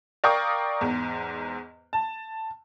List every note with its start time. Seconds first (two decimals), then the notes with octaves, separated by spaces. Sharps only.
0.24 A#4 D5 F5 G5 C#6 D#6
0.81 E2 G#2
1.93 A5